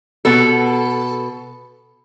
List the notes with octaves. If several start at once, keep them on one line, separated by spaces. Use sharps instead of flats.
B2 B3 A4